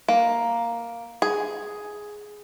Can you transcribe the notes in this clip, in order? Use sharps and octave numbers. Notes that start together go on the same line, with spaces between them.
A#3
G#4